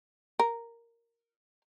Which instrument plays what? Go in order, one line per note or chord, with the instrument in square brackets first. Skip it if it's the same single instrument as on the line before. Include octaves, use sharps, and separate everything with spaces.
[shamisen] A#4